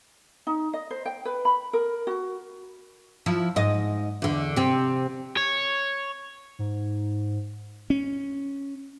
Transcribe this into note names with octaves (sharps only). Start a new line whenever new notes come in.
D#4
D#5
C5
G5
B4
B5
A#4
F#4
F3 E4
G#2 D#5
E2 D3
C3 C4
C#5
G#2
C#4